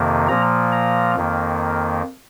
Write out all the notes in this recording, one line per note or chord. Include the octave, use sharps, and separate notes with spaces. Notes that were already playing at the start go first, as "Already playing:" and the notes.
Already playing: F2 C3 D#3 A#3
A#2 F3 A#3 A#5
A#5
F2 D#3 A#3